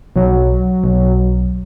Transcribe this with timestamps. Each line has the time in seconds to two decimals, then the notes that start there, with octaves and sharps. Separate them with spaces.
0.16 B1 F#3
0.84 B1